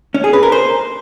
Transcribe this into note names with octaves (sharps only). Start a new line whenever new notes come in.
C#4
G#4
B4
A#4
C5